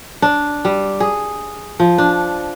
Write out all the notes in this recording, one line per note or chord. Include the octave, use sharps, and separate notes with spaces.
D4
G3
G#4
F3
D4